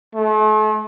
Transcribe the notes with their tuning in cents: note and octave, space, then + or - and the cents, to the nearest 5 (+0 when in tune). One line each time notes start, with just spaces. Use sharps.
A3 -40